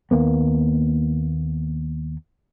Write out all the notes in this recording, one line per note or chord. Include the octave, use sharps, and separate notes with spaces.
D#2 A#3 B3